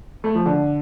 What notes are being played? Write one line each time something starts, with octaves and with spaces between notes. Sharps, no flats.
A3
F3
D3